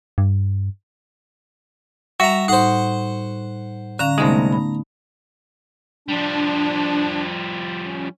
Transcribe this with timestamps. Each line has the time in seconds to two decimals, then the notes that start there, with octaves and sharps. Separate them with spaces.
0.18 G2
2.20 G3 F#4 E5 A#5
2.48 A2 D#4 C5 F#5
3.99 D3 C#4 F5 A#5
4.18 C2 G#3 A3 B3 D#4
4.52 B5
6.08 F3 G3 D4
7.86 C#4